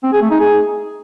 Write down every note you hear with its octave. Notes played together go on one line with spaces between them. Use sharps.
C4
G#4
A3
D#4
G#4